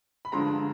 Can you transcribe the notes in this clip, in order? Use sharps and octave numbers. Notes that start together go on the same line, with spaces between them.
B5
G2 D3 F3 G#3 A#5 C6